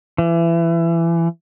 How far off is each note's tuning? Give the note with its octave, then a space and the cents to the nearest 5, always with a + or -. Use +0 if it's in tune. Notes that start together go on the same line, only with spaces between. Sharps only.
E3 +25